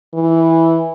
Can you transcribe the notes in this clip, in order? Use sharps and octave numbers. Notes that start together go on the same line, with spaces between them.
E3